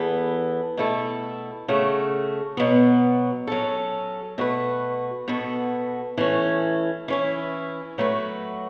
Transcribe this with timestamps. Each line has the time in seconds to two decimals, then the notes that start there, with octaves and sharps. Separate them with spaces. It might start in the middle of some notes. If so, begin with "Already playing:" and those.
Already playing: E2 E3 B3 A4
0.77 B2 A3 E4 A4
1.68 C#3 A3 F#4
2.57 B2 F#3 B3
3.47 F#3 C#4 A4
4.38 B2 A3 F#4 B4
5.28 B2 B3 F#4 A4
6.18 E3 A3 C#4
7.08 E3 C#4 E4
7.98 F#3 A3 F#4 B4